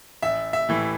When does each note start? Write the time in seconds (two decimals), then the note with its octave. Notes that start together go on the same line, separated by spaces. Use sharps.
0.22 A1 E5
0.53 E5
0.69 A2 E3